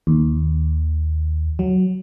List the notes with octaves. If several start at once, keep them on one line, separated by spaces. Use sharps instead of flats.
D#2
F#3